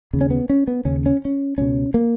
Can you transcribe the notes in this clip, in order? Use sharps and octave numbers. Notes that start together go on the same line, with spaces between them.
D#2 C#3
C#4
B3
C#4
B3
D#2 C#3 C#4
C#4
C#4
C#2 B2 C#4
A#3